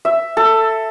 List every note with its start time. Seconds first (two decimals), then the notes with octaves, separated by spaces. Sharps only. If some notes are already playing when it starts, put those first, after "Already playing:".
0.05 E5
0.37 A4